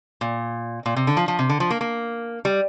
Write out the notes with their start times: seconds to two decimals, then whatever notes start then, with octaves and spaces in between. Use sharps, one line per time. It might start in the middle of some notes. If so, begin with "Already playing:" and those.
0.21 A#2
0.86 A#2
0.96 C3
1.07 D3
1.17 F3
1.28 F3
1.39 C3
1.49 D3
1.60 F3
1.71 A#3
1.81 A#3
2.45 G3